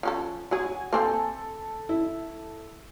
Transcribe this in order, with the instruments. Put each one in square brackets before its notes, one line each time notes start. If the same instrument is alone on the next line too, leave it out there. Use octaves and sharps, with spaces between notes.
[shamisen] F3 C#4 A4
[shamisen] F#3 G#4 [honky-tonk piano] F#4 G#5
[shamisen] A#3 C4 G#5 [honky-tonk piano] A4
[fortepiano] E4